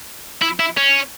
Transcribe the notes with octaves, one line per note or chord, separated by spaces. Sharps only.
E4
E4
C#4